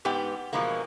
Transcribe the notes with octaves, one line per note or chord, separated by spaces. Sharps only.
G#2 B3 G4
B2 E3 F3 G#3 A#3